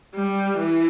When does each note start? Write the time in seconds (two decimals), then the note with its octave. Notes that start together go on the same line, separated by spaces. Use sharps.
0.14 G3
0.58 E3